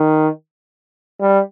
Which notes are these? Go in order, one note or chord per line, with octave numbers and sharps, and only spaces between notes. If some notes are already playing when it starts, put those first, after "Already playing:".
Already playing: D#3
G3